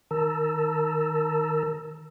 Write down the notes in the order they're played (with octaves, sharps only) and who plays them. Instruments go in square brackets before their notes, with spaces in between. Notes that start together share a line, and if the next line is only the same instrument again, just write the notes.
[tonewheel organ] D#3 A#4 A5 A#5 E6